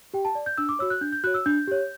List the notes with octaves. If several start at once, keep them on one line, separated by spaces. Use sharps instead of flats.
G4 G5
A5
D5
G6
D4 E6
D6
F#4 C#5 E6
F#6
D4 G6
G6
F#4 C#5 F#6
E6
D4 G6
G4 C#5